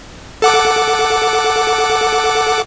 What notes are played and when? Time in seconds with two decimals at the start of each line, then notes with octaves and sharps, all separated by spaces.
0.42 A4 F#5 D6